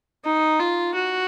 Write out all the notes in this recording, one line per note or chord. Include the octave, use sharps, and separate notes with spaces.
D#4
F4
F#4